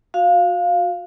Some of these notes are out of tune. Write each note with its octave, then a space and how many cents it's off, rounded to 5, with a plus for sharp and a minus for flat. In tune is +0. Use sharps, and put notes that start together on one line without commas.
F#4 -25 F5 +0